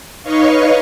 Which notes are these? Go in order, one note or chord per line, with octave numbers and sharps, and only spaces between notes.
D#4 B4 C#5 D#5 F5 C#6